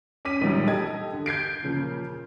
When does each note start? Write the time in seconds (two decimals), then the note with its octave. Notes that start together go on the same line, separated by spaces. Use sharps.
0.25 C#4 D6 B6 D#7
0.41 A#1 D#3 F#3 G3
0.67 G4 A4 D#5 G#6
1.13 D3
1.26 G6 G#6 C7 D7
1.63 A#2 C#3 F3